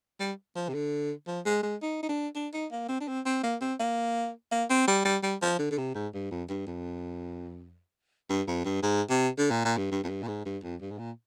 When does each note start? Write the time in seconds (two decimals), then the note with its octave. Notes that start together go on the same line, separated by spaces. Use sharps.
0.20 G3
0.56 F3
0.69 C3
0.74 D3
1.27 F3
1.45 G#3
1.63 G#3
1.82 D#4
2.03 D#4
2.09 D4
2.35 D4
2.53 D#4
2.72 A#3
2.89 C4
3.00 D4
3.08 C4
3.26 C4
3.43 A#3
3.61 C4
3.79 A#3
4.52 A#3
4.70 C4
4.87 G3
5.05 G3
5.23 G3
5.42 F3
5.59 D3
5.71 D3
5.78 C3
5.95 G#2
6.14 G2
6.31 F2
6.49 G2
6.67 F2
8.29 G2
8.47 F2
8.65 G2
8.83 G#2
9.10 C3
9.38 D3
9.50 A#2
9.65 A#2
9.77 G2
9.91 G2
10.03 F2
10.09 G2
10.22 A#2
10.28 G#2
10.45 G2
10.63 F2
10.81 G2
10.91 G#2
10.98 A#2